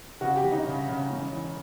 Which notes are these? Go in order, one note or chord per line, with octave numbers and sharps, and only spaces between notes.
C#3 F#4
G4
G1
D#4
C#3
C#3
E1
E2